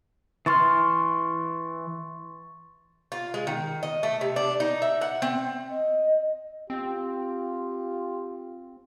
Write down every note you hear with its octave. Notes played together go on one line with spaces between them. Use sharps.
E3 C6 C#6 F6 A6
F4
G#3
D#3
D#5
A3
C3
D4
D#4
E5
F#5
C4
D#5
C4 F4 G4